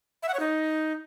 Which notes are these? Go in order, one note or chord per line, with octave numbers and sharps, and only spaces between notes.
E5
F#5
C#5
D#4